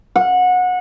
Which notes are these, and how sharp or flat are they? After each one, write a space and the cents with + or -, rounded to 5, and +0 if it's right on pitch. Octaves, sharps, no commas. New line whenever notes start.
F#5 -25